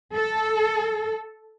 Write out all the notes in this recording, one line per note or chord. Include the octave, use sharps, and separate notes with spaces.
A4